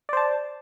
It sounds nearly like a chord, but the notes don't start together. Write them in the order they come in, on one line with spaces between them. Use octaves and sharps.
D5 C5 A5